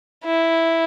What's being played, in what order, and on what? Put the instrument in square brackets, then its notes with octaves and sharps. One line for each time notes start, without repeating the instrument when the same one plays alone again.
[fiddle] E4